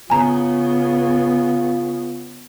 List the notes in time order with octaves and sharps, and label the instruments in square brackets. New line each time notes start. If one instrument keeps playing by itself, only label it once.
[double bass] C#3 B3 [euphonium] F4 [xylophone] G#5 A#5